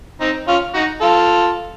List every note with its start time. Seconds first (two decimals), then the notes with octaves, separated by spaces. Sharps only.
0.21 C4 D#4
0.48 C#4 F4
0.74 D#4 F#4
1.01 F4 A4